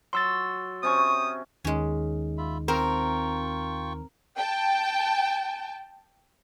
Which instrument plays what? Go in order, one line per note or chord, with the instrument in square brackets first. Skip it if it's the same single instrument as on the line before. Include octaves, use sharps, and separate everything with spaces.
[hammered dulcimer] F#3 [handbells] C6 E6 A6
[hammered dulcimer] C3 C#4 C#6 [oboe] D#6
[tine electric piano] D#2 D#3 D#4 [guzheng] G#3 C#4
[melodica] F4 E5 B5
[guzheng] C4 [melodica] F4 G5 C#6 [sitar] A#4
[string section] G5 A5